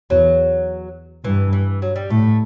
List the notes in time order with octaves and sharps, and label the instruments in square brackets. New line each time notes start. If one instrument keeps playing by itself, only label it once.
[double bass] E2 [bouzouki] F#3
[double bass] G2 [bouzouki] E3
[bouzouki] E3
F#3
G3
[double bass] A2 [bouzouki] A3